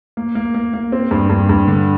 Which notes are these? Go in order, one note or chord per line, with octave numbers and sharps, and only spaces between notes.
A#3
A#3
A#3
A#3
C4
G2
G2
G2
D3